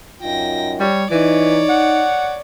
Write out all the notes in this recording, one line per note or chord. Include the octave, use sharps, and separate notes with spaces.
F#2 D#4 F4 G5 A#6
G3 C#5
E3 D#4 C#5 D5
F#5